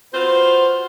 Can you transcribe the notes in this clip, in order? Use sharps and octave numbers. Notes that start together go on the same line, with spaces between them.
F4 F#4 B4 C5